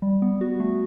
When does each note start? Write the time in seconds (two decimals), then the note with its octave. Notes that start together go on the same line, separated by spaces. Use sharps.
0.02 G3
0.22 B3
0.41 F#4
0.60 A3